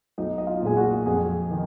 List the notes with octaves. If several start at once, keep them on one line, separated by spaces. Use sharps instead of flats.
B1 D#4 D#5
D#5
F4 F5
A#2 G#3 G#5
F#4 F#5
F2 G#4 G#5
D#3